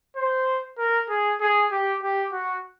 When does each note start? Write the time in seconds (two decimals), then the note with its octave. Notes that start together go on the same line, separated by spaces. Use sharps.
0.16 C5
0.78 A#4
1.09 G#4
1.41 G#4
1.72 G4
2.03 G4
2.32 F#4